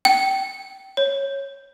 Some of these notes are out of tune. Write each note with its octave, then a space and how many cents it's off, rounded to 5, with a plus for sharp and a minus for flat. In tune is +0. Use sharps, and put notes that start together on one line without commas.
G5 -20
C#5 -10